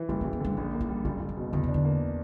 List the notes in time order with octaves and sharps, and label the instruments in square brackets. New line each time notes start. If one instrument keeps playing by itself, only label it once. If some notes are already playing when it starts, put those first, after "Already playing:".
Already playing: [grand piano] E3
[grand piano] F#1 [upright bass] G3
[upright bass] A#3
[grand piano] F#1
[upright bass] B3
[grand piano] D3 [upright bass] G3
[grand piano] A#1 [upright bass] A#3
[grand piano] A#3
[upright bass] E4
[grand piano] G3
[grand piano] F#1 [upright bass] D4
[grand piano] F#1
[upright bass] C#4
[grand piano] B2
[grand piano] E2 [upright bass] D3
[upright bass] C#3
[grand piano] D4
[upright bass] D3
[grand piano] A#3